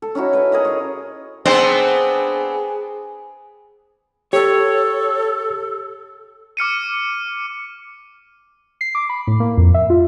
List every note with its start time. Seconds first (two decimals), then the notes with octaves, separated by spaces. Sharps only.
0.02 A4
0.15 C#4 D#4 E4 F#4
0.33 B4 E5
0.52 G#4 A#4 D#5
0.65 C#5 D#5
1.45 B3 C4 D4 G#4 C5
4.33 G4 A4 C#5
6.57 D6 F6 C#7 D#7
8.81 C7
8.95 D6
9.09 B5
9.27 A2
9.40 A#3
9.58 F2
9.74 E5
9.90 F4